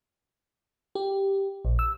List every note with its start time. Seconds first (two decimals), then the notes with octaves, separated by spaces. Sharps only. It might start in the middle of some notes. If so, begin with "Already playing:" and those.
0.95 G4
1.65 A#1
1.79 E6